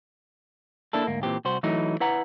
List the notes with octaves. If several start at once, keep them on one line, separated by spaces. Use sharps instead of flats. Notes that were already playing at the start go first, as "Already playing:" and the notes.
A#3 D4 E4 A4
D2 G#2 A#3
A#2 E3 C4 G4
C2 F#4 C5
E3 F#3 A3 D#4 E4
E4 B4 F#5 A#5